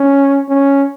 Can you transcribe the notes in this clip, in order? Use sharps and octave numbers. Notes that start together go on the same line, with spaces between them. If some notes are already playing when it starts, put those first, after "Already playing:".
Already playing: C#4
C#4